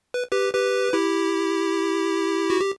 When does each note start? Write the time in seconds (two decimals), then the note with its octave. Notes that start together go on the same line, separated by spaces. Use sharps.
0.14 B4
0.32 G4 B4
0.53 G4 B4
0.93 E4 G4
2.50 F#4
2.60 G4